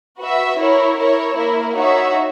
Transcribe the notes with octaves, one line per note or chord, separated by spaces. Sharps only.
F#4 B4 E5
E4 A#4 C#5
E4 A#4 C#5
A#3 E4 A#4
D#4 F#4 C#5 E5